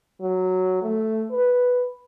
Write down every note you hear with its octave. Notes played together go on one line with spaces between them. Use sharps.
F#3
A3
B4